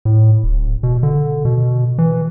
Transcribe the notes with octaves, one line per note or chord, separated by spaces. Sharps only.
A2
D1
B2
D3
B2
E3